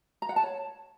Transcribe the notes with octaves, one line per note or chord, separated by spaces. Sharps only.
A#5
F#5
A5
C#5